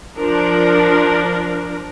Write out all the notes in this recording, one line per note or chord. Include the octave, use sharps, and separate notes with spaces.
F3 D4 A#4